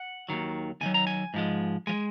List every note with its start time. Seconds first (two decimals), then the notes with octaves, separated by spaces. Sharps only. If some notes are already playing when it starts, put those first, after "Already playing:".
Already playing: F#5
0.29 D#2 D#3 F#3
0.81 D#2 D#3 F#3 G#5
0.94 A#5
1.07 G#5
1.34 G#2 F3 G#3
1.87 F3 G#3 G#5